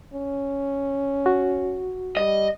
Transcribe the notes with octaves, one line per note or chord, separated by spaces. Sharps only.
C#4
F#4
G3 D#5